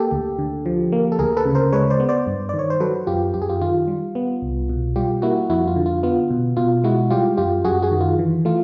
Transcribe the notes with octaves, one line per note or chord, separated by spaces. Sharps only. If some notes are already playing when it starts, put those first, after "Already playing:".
Already playing: A#3 G4 A4
D2
D3
F3
A#3
A4
D2 G#4 A#4
A4 B4
C#3
A#4 C5
G#3 B4 C#5
C5 D5
B3
C5 D5
G2
D#3 D5
C#5
C5
F#3 A4 B4
F#2 F4 G4
F#2 G4
G#4
F4 G4
D#3 F4
G3
B3
C2
B2
G3 F4 G4
A#3 E4 F#4
F2 E4 F#4
F4
D3
F4
B3 F4
B2
B2 F4
G#3 E4 F#4
G3 F4 G4
F#2 F4 G4
F#2 F#4 G#4
F#4 G#4
D#3
F4
E3
A3 F4